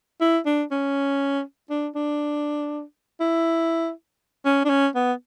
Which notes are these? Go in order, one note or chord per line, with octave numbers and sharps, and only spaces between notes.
E4
D4
C#4
D4
D4
E4
C#4
D4
C#4
B3